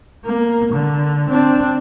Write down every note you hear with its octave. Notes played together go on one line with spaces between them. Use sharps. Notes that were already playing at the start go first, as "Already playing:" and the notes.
A#3
D3
C4 D4